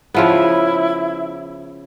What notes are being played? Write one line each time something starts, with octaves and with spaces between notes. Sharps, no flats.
C#3 F3 B3 E4